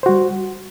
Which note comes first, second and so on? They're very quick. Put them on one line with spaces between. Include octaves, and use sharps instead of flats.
C5 F#4 G3